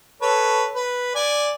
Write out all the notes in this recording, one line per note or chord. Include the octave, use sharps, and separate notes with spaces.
A4 B4 C#5
B4
D5 G#5